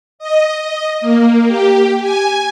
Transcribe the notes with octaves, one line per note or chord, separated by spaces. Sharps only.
D#5
D#5
A#3
G4
G#5